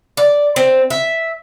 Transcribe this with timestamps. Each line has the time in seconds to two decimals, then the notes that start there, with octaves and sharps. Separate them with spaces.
0.17 D5
0.56 C4
0.90 E5